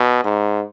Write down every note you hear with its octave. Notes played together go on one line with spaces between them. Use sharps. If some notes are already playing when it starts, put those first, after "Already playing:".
Already playing: B2
G#2